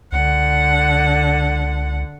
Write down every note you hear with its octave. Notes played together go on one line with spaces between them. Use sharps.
C#2 D3 F#5